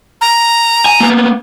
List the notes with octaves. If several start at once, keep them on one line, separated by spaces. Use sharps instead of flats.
A#5
G#5
A#3 B3